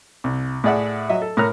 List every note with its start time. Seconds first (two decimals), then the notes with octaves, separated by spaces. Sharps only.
0.24 C2
0.64 A2 G#4 D5 E5 F#5
1.09 F#3 D#5 E5
1.22 A4
1.37 A2 A#4 C#5 F6